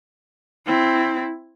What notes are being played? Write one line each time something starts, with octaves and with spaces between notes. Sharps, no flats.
C4 E4